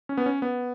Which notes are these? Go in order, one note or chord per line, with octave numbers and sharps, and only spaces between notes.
C#4
B3
C#4
B3